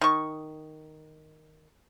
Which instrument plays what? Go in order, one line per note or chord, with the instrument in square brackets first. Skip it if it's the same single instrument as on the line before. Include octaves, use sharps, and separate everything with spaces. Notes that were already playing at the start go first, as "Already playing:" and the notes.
[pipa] D#3 C#6